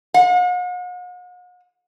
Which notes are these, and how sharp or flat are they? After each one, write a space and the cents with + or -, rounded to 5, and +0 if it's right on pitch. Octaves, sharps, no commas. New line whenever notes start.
F#5 -45